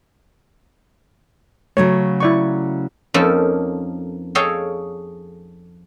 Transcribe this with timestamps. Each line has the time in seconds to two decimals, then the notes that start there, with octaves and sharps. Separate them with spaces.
1.77 C#3 F#3 A3 C#5
2.20 E4 D5 C#6
3.14 F2 F3 A#3 C#4 D#4 A4
4.35 G#4 A4 C#5 D#5 F5 G5